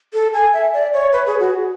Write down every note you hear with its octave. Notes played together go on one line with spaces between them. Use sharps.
A4
G#5
E5
D5
C#5
B4
G#4
F#4